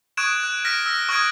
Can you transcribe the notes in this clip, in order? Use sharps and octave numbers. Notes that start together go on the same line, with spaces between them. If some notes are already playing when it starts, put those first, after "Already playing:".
C#6 D#6 F#6 G#6 D7 E7
F#6
F6 A#6 B6 D7
E6 A#6
C#6 D#6 F#6 G#6 D7